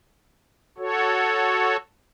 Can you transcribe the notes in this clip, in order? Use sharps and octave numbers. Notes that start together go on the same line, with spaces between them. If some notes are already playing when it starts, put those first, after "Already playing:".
F#4 A4 C#5